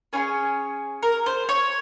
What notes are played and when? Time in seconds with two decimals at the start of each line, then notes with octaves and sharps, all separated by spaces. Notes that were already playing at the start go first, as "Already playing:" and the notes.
0.13 C#4 F4 G#4 C#5
1.03 A#4
1.26 C5
1.49 C#5